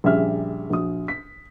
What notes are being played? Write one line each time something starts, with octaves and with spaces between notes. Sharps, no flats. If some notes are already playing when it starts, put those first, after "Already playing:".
A#1 C#3 G3 G#4 E5 F6
A#1 F#4 D#6
B6